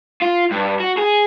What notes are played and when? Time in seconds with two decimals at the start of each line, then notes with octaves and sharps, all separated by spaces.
0.22 F4
0.51 G2
0.80 F#4
0.98 G#4